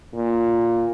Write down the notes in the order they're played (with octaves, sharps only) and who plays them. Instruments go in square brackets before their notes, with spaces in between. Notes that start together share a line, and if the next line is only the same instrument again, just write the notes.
[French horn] A#2